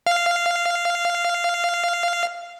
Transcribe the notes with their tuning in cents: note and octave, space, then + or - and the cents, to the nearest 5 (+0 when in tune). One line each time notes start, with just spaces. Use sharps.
F5 -10